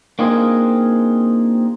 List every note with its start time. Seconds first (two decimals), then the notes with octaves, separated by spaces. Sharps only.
0.19 A#3 C4 D4 D#4 F4 G#4